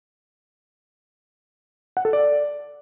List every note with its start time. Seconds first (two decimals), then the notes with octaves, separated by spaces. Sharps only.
1.97 F#5
2.05 A4
2.13 D5